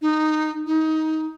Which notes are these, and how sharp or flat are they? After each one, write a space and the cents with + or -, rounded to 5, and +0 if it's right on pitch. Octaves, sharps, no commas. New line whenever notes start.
D#4 -10
D#4 +20